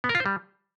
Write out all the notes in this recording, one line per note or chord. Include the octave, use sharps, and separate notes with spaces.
B3
A#4
F4
C5
G3